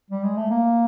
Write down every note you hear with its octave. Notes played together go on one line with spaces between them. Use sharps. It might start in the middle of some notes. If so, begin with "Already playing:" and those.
G3
G#3
A3
A#3